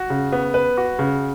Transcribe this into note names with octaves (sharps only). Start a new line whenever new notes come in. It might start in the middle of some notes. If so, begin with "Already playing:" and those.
Already playing: F#4
C#3
B3
B4
F#4
C#3